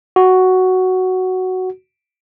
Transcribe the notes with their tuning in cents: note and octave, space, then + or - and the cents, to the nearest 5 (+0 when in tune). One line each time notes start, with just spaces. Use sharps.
F#4 +5